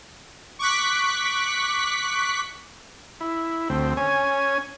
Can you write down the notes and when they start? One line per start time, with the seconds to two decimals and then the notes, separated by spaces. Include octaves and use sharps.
0.59 C#6 D6 F#6 B6
3.20 E4
3.70 D2 C4
3.97 C#4 G#5